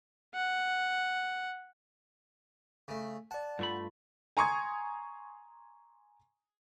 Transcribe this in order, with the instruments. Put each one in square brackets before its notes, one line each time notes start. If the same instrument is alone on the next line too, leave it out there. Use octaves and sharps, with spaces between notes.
[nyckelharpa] F#5
[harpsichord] C#3 A3
[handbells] D5 A5 [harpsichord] F#5
[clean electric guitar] G2 A3 B5 [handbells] F4
[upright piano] G#5 A#5 C6 C#6 D#6 G#6